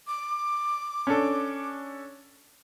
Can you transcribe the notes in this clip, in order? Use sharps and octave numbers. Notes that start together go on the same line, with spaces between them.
D6
C#4 D4 A4